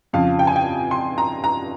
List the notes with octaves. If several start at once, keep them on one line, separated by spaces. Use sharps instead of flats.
F2 C#3 F3 F5
G5
G#5
G5
C6
A#5
A#5